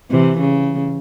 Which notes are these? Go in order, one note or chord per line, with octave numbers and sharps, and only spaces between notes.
C3 E3
C#3